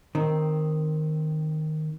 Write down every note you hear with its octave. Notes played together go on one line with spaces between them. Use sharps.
D#3 C4